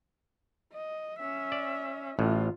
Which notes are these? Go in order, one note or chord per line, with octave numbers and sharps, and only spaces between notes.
D#5
C#4 E5
D5
A1 A2 F4